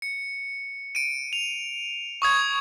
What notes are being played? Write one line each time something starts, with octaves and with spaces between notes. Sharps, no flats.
C#7
D7 D#7
F7
C#6 D#6 G#6